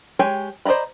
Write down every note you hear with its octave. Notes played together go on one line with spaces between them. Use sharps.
G#3 G4 C#5 G5 G#5
C5 D5 D#5 A#5 B5